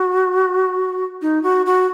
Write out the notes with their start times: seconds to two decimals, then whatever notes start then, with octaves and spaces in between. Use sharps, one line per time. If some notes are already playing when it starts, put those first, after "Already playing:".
Already playing: F#4
1.22 D#4
1.43 F#4
1.66 F#4